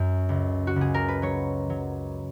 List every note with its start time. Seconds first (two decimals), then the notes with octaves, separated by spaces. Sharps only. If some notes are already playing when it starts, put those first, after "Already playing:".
Already playing: F#2
0.29 C#2
0.67 F#4
0.76 C#2
0.81 G#4
0.94 A#4
1.08 B4
1.22 F#3 C#5
1.70 F#3